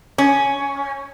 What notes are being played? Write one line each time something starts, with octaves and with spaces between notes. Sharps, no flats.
C#4